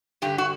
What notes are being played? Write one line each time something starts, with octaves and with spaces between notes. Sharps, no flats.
G2 D3 G4
F#4